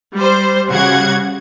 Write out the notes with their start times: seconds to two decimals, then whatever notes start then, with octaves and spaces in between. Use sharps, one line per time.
0.16 G3 C5
0.70 C#3 G3 F#4 F#5 G#6